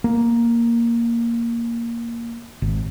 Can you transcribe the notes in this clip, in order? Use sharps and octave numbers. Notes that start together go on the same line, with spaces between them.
A#3
G#1